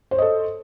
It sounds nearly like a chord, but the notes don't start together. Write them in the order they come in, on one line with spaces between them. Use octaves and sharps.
C5 C#5 D#5 A4